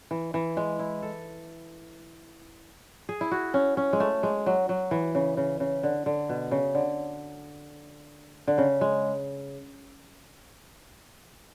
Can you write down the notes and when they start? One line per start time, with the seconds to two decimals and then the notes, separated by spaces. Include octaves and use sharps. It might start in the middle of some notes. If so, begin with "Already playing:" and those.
0.11 E3
0.34 E3
0.57 G#3
0.79 E4
1.02 A4
3.09 G#4
3.21 E4
3.31 F#4
3.54 C#4
3.77 C#4
3.93 G#3
4.00 A3
4.23 G#3
4.46 F#3
4.69 F#3
4.91 E3
5.15 C#3
5.37 C#3
5.60 C#3
5.83 D3
6.06 D3
6.29 B2
6.51 C#3
6.75 D3
8.48 D3
8.58 C#3
8.81 G#3